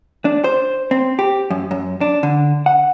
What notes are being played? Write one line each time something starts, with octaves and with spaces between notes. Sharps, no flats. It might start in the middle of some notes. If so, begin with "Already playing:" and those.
D4
C5
C4
G4
F#2
F#2
D4
D3
F#5